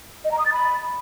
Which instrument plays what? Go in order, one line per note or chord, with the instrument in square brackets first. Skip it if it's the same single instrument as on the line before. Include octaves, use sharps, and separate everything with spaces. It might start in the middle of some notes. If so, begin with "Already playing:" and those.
[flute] D#5
A#5
D#6
A6
B5